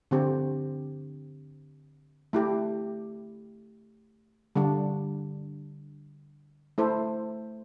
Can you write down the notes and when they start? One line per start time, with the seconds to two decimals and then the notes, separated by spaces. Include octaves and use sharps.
0.11 D3 C4 G4
2.33 A3 E4 G4
4.55 D3 G3 D4
6.78 A3 E4 A4 C5